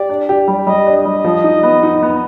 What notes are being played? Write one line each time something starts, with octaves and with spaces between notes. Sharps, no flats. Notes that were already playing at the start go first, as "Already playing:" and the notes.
Already playing: G4 D5
D4
G4
G3
G3 D#5
D4
D#5
G3
F3
D#4
B3
D#4
B3